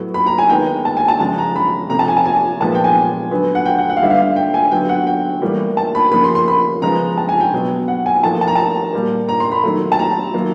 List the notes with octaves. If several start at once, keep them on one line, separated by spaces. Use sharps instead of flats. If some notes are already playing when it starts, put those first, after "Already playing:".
Already playing: A2 F#3 B3
B5
A#5
G#5
D#3 G#3 B3 G5
A5
G#5
A5
C#3 F3 G#3 A5
A#5
B5
C3 F3 A3 A#5
A5
G#5
A5
G#5
A#2 F3 G#3 B3 A5
G5
G#5
D3 F#3 B3
F#5
G5
F#5
F#5
F5
D3 G3 B3 E5
F5
G5
G#5
D3 F#3 B3 G5
F#5
G5
A2 E3 G3 A#3
A5
B5
C#3 F3 A#3 B5
C6
C6
B5
C#3 F3 G#3 B3 A#5
A5
G#5
G5
B2 F#3 B3
F#5
G#5
A2 F3 A#3 A5
A5
A#5
A5
A#2 G3 A#3
A#5
C6
B5
D#3 F#3 A3
A5
A#5
D#3 F#3 A#3